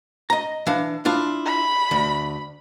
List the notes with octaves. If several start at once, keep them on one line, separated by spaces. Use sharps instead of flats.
D#5 A#5
E3 D4 F5
D4 E4 F4
B5
D2